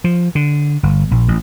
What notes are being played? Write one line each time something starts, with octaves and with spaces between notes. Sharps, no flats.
F3
D3
G1
A#1
A1